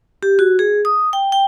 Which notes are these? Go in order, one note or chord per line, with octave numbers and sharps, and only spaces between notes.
G4
F#4
G#4
D#6
G5
G5